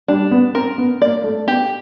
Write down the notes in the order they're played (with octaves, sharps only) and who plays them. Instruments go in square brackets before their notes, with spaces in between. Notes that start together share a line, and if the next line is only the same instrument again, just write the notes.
[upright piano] G3 [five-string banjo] D4
[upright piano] B3
[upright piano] C4 [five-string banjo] A#4
[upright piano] B3
[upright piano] A#3 [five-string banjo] D5
[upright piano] A3
[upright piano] B3 [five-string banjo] G4